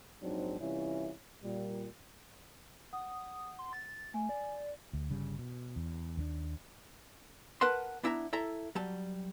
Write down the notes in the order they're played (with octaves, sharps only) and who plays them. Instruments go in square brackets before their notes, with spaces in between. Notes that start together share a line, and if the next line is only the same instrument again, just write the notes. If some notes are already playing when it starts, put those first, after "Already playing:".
[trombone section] A#1 G#2 F#3 C4 D4 D#4
C3 E3 G3 C#4 E4 F4
A#2 G3
[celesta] F#5 [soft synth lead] D#6
[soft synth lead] C6
A6
[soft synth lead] A3 [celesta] G#5
[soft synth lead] D5
[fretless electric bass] D2
G1 C#3 G3
B2
E2
D#2 B3 D4
[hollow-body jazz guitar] A#4 B4 F#5 A5 C6
B3 D4 E4 E5 F#5 A#5
E4 A4 E5 A#5
F#3 G3 A5